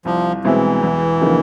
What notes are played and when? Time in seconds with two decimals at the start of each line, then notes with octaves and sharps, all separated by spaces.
0.05 C2 F3
0.45 B2 E3 G#3 C4 E4
0.82 E2
1.21 C#3 F3 A#3 D#4